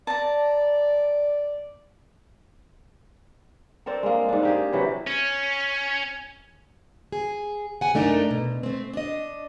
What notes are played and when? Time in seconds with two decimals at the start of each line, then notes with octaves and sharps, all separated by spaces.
0.07 D5 A5 A#5
3.86 C4 D4 A4 A#4
4.03 G#3 A#3
4.29 G#2 D4
4.43 A#3 G4 G#4
4.73 C3 E3 F#3
5.07 C#4
7.12 G#4
7.81 F#5 G#5
7.94 F#2 A3 D4 D#4 A#4
8.31 B2
8.63 A3 C4
8.93 D4 D#5